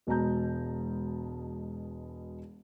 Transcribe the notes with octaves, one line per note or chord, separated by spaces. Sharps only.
E1 B2 G#3 A5 A#5 G6